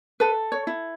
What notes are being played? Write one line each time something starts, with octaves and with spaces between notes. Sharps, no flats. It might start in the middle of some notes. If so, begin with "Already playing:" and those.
A4 B4
C#5
E4